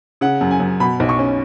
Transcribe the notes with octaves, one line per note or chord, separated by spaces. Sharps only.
C#3 F#5
F#2
G#5
F#2
B2 B5
B1
C#6
C#4